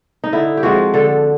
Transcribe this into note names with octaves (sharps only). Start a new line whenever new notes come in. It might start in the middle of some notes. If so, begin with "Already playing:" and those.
D#4
D3 E4
G4
F3 G#3 C4 F#4
D3 A4